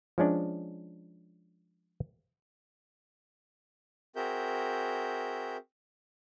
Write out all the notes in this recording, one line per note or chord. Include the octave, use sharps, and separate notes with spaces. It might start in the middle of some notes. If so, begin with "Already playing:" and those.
F3 G#3 C#4 D4
C4 F#4 G#4 A#4 E5 G6